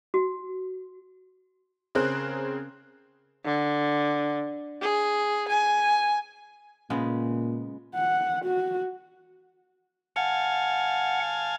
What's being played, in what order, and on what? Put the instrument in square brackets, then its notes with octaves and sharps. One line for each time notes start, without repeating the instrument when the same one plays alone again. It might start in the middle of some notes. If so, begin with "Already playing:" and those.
[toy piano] F#4
[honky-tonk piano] C#3 C4 G#4 A#4 C5 F#6
[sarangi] D3
G#4
G#5
[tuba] A#2 [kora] C#3 G#3 B3
[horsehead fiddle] F#5
F#4
[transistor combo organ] F5 G#5 A5 [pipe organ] F#5